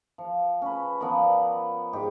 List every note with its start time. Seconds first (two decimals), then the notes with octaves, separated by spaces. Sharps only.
0.18 F3
0.62 C#4 B4
1.00 F3 B3 A#4 D5
1.93 G#2 G4